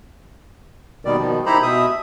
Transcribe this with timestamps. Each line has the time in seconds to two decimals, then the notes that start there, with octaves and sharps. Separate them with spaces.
1.05 D#2 B2 D#3 G3 D5
1.18 B2 D#3 F3
1.46 D#4 E4 G4 C5 A#5 B5
1.63 B2 E5 D#6